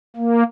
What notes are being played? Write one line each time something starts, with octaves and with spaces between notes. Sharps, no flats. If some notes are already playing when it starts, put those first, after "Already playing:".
A#3